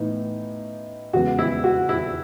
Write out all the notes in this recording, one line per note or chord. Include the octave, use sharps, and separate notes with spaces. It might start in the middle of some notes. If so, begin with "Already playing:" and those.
Already playing: A2 E3 B3 D#4
E2 C#3 G#3 B3 F#4
E4
F#4
E4